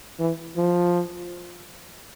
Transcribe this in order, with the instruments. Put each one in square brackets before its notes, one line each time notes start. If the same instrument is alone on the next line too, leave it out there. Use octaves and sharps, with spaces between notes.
[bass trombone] E3
F3